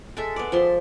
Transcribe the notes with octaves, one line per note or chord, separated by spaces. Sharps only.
G#3 A4 E5
B3 D5
F3 E5 C6